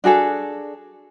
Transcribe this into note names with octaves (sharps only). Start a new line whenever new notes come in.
D4 F#4 G#4 A4